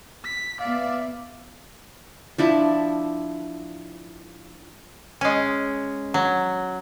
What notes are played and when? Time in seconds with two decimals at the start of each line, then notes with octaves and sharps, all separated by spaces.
0.24 B6
0.60 B3 D5 E5 F5
2.38 F3 D4 E4 E5
5.21 G#3 C#4
6.14 F#3